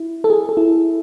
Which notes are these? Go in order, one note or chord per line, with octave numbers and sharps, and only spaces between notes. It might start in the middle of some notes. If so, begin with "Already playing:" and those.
Already playing: E4
A4
G#4
A4
E4